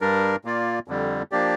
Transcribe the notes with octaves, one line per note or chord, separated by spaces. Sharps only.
G2 G3 D4 A#4
A#2 A#3 F4 D5
F2 D3 G3
F3 A#3 D4 G4 D5